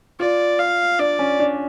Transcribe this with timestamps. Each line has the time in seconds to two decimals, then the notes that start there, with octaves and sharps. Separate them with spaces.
0.20 F4 D5
0.59 F5
0.99 D4 D5
1.19 C#4
1.40 D4